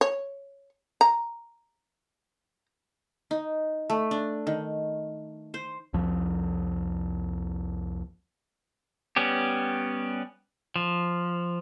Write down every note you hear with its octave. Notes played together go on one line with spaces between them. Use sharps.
C#5
A#5
D#4
A3
D4
D#3
C5
C2 F2 F3
G3 B3 C#4 G4
F3